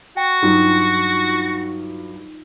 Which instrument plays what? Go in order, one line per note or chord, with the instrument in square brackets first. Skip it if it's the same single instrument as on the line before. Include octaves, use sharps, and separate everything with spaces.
[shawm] F#4 [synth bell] G5
[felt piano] G2 F#3 [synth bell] D#4 F4